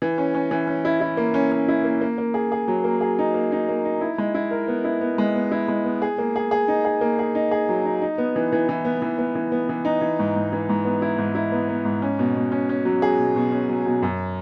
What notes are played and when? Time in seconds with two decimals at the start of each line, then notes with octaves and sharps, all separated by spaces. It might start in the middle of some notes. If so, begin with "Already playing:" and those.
0.02 E3
0.18 C#4
0.34 C#4
0.51 E3
0.67 C#4
0.85 E4
1.01 E4
1.17 A#3
1.34 C#4
1.52 C#4
1.68 E4
1.84 A#3
2.01 A#3
2.18 A#3
2.34 G#4
2.52 G#4
2.68 F#3
2.84 A#3
3.01 G#4
3.19 D#4
3.34 A#3
3.52 D#4
3.69 A#3
3.85 D#4
4.01 E4
4.18 G#3
4.35 E4
4.51 A#4
4.68 B3
4.85 E4
5.01 B3
5.18 G#3
5.36 B3
5.52 E4
5.68 G#3
5.85 B3
6.02 G#4
6.18 A#3
6.36 G#4
6.51 G#4
6.68 D#4
6.85 G#4
7.01 A#3
7.19 G#4
7.35 D#4
7.51 G#4
7.69 F#3
7.85 D#4
8.02 D#4
8.18 B3
8.36 E3
8.52 E3
8.69 E3
8.85 B3
9.02 E3
9.18 B3
9.35 E3
9.52 B3
9.69 E3
9.85 D#4
10.01 E3
10.19 G#2
10.36 G#2
10.53 E3
10.69 G#2
10.85 B3
11.02 E4
11.18 G#2
11.35 E4
11.52 B3
11.69 B3
11.85 G#2
12.02 C#4
12.19 B2
12.35 B2
12.52 C#4
12.69 C#4
12.85 F#3
13.02 G#4
13.18 B2
13.36 B2
13.52 C#4
13.69 F#3
13.86 B2
14.02 F#2